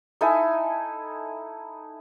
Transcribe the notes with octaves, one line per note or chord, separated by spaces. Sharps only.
D#4 E4 A4 G#5